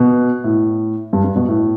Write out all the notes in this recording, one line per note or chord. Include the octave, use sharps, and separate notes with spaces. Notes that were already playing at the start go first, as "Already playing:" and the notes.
Already playing: B2
A2
G2
G2
B2
A2